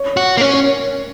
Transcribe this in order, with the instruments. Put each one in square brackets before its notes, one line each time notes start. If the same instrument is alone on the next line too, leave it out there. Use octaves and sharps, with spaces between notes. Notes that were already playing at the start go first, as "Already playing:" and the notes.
Already playing: [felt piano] C#5
[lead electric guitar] F#4
A#3
[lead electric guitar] C#4 [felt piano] C#5
[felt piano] C#5